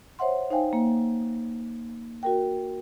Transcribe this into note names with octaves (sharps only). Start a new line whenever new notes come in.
C5 C#5 E5 F#5 C6
D#4 C5 F5 G5 G#5
A#3
F#4 A#4 G5